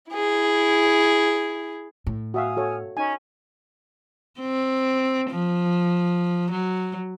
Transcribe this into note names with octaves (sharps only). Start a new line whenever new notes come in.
E4 G#4
A2
F#4 E5 F5 G#5 D#6 F6
F#4 A4 C#5
C#4 D#4 G#5
C4
F3
F#3